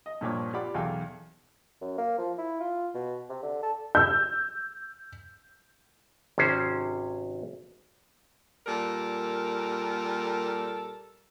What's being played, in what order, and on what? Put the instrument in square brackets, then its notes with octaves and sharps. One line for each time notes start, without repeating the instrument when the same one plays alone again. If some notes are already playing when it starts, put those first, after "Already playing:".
[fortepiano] D#5
G2 A#2 F3 C#5 D6
F4 G4 D5 F#5 B5 D6
B1 E2 A4 F5 G5 G#5
[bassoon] F#2
A#3
F3
E4
F4
B2
C3
D3
A4
[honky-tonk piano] E6 G6
[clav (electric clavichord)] G#1 C3 C#4 C5
[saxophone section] A#2 G3 A4 A#4